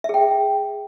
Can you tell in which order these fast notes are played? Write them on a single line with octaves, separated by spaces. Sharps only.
E5 G#4 G5